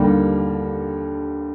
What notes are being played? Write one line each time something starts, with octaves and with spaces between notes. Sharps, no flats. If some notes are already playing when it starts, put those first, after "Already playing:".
Already playing: D#2 D3 G3 A#3